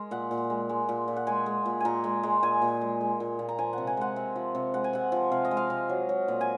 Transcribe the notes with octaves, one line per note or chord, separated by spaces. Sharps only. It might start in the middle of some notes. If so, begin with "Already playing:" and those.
Already playing: G#3 A#4
A#2 F#5
A#2
G#3
G#3
A#2
A#2
F#5
G#3 G#5
G#3
A#2
A#2 G#5 A#5
G#3
G#3
A#2 G#5
A#2
G#3
G#3
A#2
A#2
A#5
F3 G#5
C3 F#5
G#5
G#3 F#5
C3
F3
C3
G#3 F#5
G#5
C3 F#5
F3
C3 F5
D#5
G#3
F5
C3
F#3
F#3
A#2
G#5